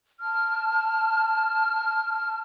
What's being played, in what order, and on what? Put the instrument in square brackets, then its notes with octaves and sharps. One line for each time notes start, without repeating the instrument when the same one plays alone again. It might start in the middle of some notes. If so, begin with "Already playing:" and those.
[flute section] A5 F6